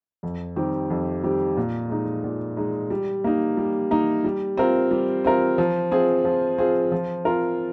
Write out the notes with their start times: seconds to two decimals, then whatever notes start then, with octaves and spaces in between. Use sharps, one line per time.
0.23 F2
0.56 D#3 G3 C4 G4
0.90 F2
1.23 D#3 G3 C4 G4
1.57 A#2
1.90 G#3 D#4
2.24 A#2
2.57 G#3 D#4
2.90 G3
3.24 A#3 D#4
3.57 G3
3.91 A#3 D#4
4.24 G3
4.57 C4 F4 A#4
4.91 G3
5.24 C4 F4 A#4
5.58 F3
5.91 C4 F4 G#4
6.25 F3
6.58 C4 F4 G#4
6.92 F3
7.25 C4 F4 A#4